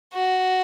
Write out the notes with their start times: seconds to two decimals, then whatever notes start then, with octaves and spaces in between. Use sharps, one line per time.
0.14 F#4